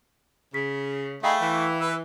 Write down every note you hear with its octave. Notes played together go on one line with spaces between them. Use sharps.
C#3 B6
A3 D#4 G#4 F5 G5 B5
E3
B4 E6